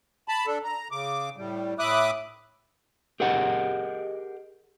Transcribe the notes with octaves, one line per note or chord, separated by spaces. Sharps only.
A5 B5
D4 A4
A#5
C#3 D6
A2 G3
A2 E5 B5 D6 D#6 F#6
G4 G#4 A#4 D#5 F#5